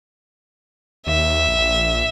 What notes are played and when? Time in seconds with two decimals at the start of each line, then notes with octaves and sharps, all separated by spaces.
1.07 D#2 E5
1.48 A#1